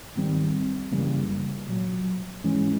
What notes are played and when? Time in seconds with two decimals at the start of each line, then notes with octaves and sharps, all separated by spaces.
0.16 G#2 D#3 G3 C4
0.92 F#2 C#3 E3 G3 A#3
1.68 C2 A#2 F#3
2.43 G#2 E3 G#3 C#4